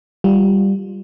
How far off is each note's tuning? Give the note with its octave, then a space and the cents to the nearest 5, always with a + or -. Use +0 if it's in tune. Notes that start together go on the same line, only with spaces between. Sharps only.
G3 +0 F4 +5